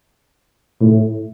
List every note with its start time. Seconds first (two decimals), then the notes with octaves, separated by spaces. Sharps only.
0.81 A2